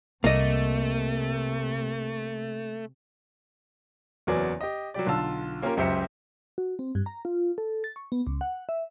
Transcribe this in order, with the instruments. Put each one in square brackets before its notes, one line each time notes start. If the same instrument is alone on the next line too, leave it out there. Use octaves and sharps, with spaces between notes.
[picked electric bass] C2 [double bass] C3 [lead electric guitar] A3 [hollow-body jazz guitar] A#3 D#5
[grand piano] F#1 E2 F#3 B3 D5 G#5
G4 D#5
F#3 G3 G4 D5
B1 D3 F4 A5 E6
A#3 C#4 F4 G4 A#4
C#2 F#2 G4 C5 E5 C#7
[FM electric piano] F#4
C4
G2
A#5
F4
A4
A6
C#6
B3
C#2
F#5
E5